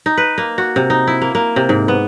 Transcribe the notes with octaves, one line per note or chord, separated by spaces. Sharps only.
D#4
B4
A#3
F#4
C3
D#4
E4
A#3
A#3
C3
G#2
B3